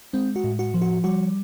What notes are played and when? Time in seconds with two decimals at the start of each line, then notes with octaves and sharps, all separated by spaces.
0.13 G#3 C4
0.36 F#4
0.44 A2
0.59 F#4
0.74 F3
0.81 F#4
1.04 G3 F#4